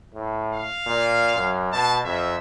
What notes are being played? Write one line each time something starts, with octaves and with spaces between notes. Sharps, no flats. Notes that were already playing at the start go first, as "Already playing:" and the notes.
A2
F5
A#2
F#2
B2 A5
F2 E5